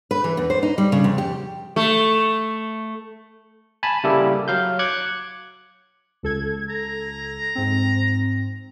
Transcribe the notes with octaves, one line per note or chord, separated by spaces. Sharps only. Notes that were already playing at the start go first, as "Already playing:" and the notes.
B4
E3
E2
C5
D#4
G3
C#3
F2
G4
A3
G#5 A5 B5
C#3 G3 A#3 E4 G4 A4
F#3 F5 G6
D6 F#6 G#6 C#7
C#2 A4 G#6
A#5
G#2 C4